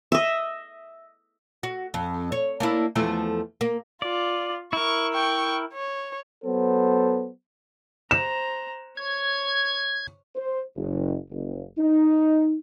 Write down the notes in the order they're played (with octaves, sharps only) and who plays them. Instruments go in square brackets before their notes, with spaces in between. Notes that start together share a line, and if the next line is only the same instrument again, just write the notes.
[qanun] D#5 E5
[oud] F#4
F2
C#5
A#3 D4 E4
E2 F3 A3
A#3
[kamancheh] F4 [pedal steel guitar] D5
[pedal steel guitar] E4 A#4 [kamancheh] C#6
[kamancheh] G5 C#6
C#5
[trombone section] F#3 B3 A4 C5
[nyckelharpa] C5 A#5 [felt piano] E7
[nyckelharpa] C#5 [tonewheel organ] G#6
[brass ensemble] C5
F#1
F#1
D#4